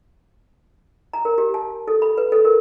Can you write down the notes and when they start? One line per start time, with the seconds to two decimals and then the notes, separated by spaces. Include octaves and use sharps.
1.13 A#5
1.25 A#4
1.38 G4
1.54 A5
1.88 A4
2.02 B5
2.18 B4
2.32 A4
2.45 A#4